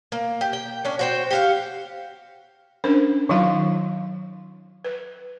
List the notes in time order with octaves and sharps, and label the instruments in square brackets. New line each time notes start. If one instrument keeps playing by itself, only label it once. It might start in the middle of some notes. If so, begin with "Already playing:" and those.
[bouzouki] A#3
G4
G5
C#4 D4
F#4 C5 G5
G4 F5 F#5
[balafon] C#4 D4 A#4 C5
D#3 F#3 D#4 F4 F5
B4